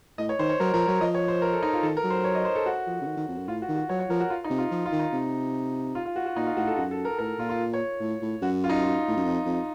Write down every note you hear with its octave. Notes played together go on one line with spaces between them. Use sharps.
A2 D#5
C#5
D#3 C5
C#5
F#3 A#4
F3 A#4
F#3 C#5
F3 D#5
C#5
C5
A#4
A4
D#4
F4
D#3 A4
A#4
F#3
C5
C#5
D#5
C5
A4
F#4
F3
C#3
D#3
D#3
F2
F#2
A2 F4
F#4
D#3
F#4
F#3 C#5
C#5
F3 A#4
F#4
F4
D#4
C3
F4
F3
F4
D#3
D#4
C3
F4
F4
F#4
F#4
A#2 D#4
F4
A2 F#4
A4
F#2 F#4
A4
A#4
A2 A#4
A#2 F4
F4
C#5
A2
A2
F#2 F#4
F4
D#4
F4
A2
F#2
F2
F2